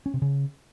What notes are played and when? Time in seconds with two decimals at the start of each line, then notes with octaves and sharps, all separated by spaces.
0.06 C#4
0.14 C3
0.22 C#3